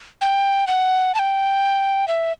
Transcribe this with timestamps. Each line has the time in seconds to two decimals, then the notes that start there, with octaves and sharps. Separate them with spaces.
0.21 G5
0.67 F#5
1.15 A5
1.19 G5
2.08 E5